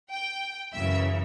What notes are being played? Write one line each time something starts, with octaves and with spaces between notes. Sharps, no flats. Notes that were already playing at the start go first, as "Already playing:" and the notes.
G5
F#2 C#3 E3 E5